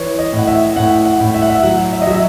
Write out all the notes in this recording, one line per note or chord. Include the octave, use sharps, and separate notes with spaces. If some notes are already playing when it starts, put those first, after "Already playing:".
Already playing: E3 C#5
D#5
A2
F#5
E5
A2 F#5
F#5
A2
E5
F#5
E5
F#3 F#5
E5
D#5
F#3 E5